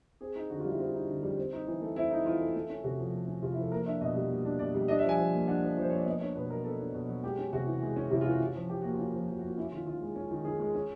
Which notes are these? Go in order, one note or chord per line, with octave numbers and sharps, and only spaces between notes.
C4 G#4
D#4
D3 F#4
F4
G3 E4
C4 F4
D#4
D3
G3
C4
D#4
E3
A3
C4 E4
D#4
E3 F4
A3
A3
C#4
C3 F#4
F3
A3
C#4
C3 F4
E4
F3 A4
A#3 A#4
D4 E5
B2 D#5
G3
A#3
D4
B2 D5
G3
D4 D#5
E5
F3 G#5
F3
A#3
D4 F#5
F3
F3 C5
A#3 C#5
D5
B3 D#5
D4 C#5
B2 B4
F#3 A#4
B3 A4
D4
B2
F#3
G#3 G4
C#4
C3 F#4
E3
G#3
C#4
C3 E4
F4
E3 F#4
C#4
F3
F3 G4
A#3 F#4
C#4 F4
F#4
F3
F3 F#4
F#4
A#3
F4
C#4 E4
D#3 F4
D#3 F4
G#3
C#4
D#3
D#3 G#4
G#3
C#4